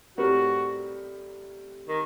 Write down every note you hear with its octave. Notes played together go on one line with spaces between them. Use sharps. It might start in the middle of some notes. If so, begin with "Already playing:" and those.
A2 G3 C4 F#4 G4 A#4
D#3